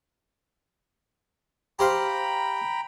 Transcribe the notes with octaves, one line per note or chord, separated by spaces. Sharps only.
G4 C5 F5 G5 A#5 B5